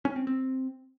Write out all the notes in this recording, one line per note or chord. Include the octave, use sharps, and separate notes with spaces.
C#4
C4
C4